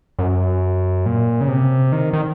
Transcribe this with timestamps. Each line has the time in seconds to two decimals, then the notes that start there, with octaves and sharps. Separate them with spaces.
0.19 F#2
1.06 A#2
1.41 C#3
1.48 C3
1.92 D#3
2.13 D#3